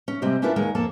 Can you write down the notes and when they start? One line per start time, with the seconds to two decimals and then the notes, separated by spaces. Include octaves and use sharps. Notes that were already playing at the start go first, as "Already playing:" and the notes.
0.08 C#4
0.22 C3 G3 G#3 C4
0.42 C#4 D4 E4 F4 A#4 B4
0.56 D#2 G#3 A#4 C#5
0.75 F2 A#3 A4 A5